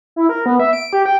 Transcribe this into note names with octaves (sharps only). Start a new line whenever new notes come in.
E4
A#4
B3
E5
D7
G4
G5